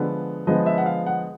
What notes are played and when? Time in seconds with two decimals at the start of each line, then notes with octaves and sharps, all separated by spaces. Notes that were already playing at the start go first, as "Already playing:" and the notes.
Already playing: D3 F3 G#3 B3
0.46 D3 F3 G#3 B3 D#5
0.66 E5
0.78 F#5
0.86 F5
1.06 F#5